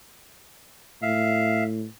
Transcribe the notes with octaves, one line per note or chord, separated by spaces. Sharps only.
A2 E5 F5